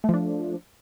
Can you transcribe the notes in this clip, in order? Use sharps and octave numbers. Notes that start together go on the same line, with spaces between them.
F3 A3 D4